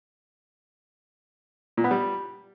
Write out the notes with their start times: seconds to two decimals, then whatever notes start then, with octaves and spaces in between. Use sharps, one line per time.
1.77 A#2
1.84 B3
1.91 G3